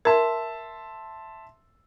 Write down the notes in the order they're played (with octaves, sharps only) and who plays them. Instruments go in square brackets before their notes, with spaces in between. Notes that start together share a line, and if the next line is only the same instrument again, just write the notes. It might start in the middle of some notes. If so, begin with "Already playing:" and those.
[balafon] A#4 [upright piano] E5 A5 C6